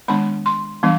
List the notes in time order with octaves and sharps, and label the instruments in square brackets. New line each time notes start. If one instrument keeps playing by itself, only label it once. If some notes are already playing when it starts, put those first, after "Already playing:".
[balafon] D#3 G#3 B3 D4 B5
C6
E3 G3 B3 D4